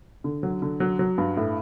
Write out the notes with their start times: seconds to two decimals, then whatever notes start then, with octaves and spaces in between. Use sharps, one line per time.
0.24 D3
0.43 F#3
0.62 D3
0.80 F#3
0.99 F#3
1.18 G2
1.37 A2